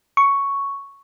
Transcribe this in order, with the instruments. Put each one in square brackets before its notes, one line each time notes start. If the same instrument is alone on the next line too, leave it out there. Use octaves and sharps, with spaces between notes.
[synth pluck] C#6